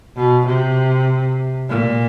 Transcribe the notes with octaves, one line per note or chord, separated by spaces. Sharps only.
B2
C3
A#2